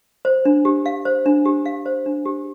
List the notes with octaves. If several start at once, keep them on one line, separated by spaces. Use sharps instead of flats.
C5
D4
G4
F5
C5
D4
G4
F5
C5
D4
G4